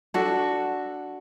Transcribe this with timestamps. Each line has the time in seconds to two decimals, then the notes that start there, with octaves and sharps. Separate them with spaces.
0.14 D4 F#4 A4